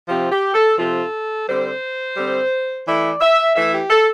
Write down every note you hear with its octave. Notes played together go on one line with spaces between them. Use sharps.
C3 F3 C4 F4 G4
G4
A4
C3 F3 C4 F4 A4
D3 G3 C4 C5
D3 G3 C4
E3 A3 E4 D5
E5
E3 A3 E4 E5
G4
A4